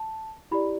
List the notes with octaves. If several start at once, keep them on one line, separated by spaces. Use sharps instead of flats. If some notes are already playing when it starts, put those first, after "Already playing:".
Already playing: A5
E4 G4 D5 B5